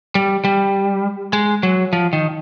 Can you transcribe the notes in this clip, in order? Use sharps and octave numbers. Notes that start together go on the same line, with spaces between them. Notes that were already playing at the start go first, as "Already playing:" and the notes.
G3
G3
G#3
F#3
F3
D#3